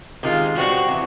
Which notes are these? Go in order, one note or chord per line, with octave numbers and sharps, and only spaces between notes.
C3 D#3 G#3 F4
B2 G3 C4 F#4
C3 E3